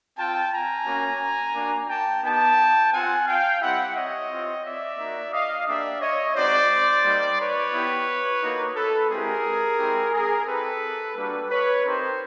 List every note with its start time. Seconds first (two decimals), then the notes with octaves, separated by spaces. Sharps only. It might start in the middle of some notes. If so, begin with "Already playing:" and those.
0.18 C4 F4 G5 A5
0.52 G#5 A#5
0.86 A#3 C#4 F#4
1.55 A#3 D4 F#4
1.89 G5 A5
2.24 B3 D#4 G4 G5 A5
2.92 C4 F4 F#5 G#5
3.27 F5 G5
3.61 G3 C4 E4 G4 E5 F#5
3.95 C#5 D#5
4.30 C4 F4
4.64 D5 E5
4.98 A#3 D#4 F#4
5.32 D#5 F5
5.67 A#3 D4 G4 D5 E5
6.01 C#5 D#5
6.35 G#3 C4 D#4 F#4 C5 D5
7.04 G3 A#3 D#4
7.39 B4 C#5
7.73 B3 E4 G4
8.41 A#3 D#4 F#4
8.76 A4 B4
9.10 G#3 C4 E4 G4 G#4 A#4
9.79 G#3 C4 E4 G4
10.13 G#4 A#4
10.47 C4 E4 G4 A4 B4
11.16 G3 A#3 D4 F#4 A4 B4
11.50 B4 C#5
11.84 C4 D#4 G4 A#4 C5